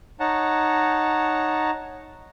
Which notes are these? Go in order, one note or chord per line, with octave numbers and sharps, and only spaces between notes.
D#4 C#5 F#5 A5 A#5